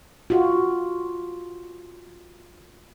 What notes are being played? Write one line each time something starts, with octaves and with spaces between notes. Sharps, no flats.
F4 F#4